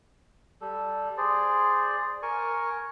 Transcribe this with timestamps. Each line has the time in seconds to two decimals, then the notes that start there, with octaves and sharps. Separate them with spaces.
0.61 G3 A4
1.17 G#4 C5 D5
2.23 A#4 G#5 C#6